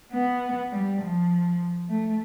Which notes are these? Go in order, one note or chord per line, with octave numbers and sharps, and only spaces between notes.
B3
G3
F3
A3